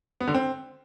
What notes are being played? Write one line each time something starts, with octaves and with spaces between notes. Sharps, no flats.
B3
D3
C4